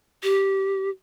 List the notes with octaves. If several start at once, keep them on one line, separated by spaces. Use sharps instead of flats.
G4